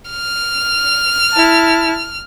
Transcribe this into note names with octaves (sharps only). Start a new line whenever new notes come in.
F6
E4 A5